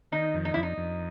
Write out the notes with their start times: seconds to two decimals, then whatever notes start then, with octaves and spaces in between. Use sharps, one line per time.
0.12 D#3 D#4
0.34 F2
0.45 D#4
0.54 F2 E4
0.63 D#4
0.78 F2